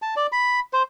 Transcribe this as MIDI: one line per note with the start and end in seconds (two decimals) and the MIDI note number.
0.02 0.15 81
0.16 0.27 74
0.32 0.60 83
0.73 0.83 72